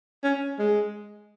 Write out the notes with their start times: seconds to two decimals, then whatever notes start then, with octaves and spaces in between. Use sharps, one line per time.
0.24 C#4
0.59 G#3